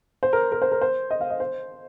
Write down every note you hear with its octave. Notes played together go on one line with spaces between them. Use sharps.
C5
A#4
A#4
C5
A#4
C5
D#5
F5
D#5
C5